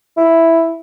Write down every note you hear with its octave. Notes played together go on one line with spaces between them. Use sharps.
E4